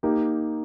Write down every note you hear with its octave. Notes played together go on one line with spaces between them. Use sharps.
A#3 D#4 G4